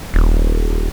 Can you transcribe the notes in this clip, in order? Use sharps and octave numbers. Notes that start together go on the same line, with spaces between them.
D#1